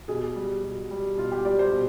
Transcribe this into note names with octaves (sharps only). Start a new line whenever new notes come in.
B2 G#4
G3
B2
G3
B2 F4
G4
G3 D5
C5
B2